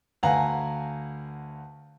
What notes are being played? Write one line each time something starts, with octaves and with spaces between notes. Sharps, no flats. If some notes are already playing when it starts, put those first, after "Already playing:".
D2 B4 F5 F#5 G#5 A#5